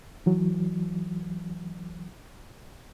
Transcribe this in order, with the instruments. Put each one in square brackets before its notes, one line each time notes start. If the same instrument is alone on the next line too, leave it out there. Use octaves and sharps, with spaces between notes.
[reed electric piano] E3 F#3